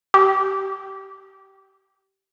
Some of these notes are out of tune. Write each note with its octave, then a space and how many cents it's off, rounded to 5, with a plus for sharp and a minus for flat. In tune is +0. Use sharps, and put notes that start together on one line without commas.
G4 -20